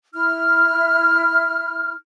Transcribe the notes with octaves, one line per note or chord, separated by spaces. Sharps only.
E4 F6